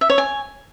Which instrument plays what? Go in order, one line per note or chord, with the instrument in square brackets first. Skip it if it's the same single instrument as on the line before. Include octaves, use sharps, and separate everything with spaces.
[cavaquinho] E5
C#5
G#5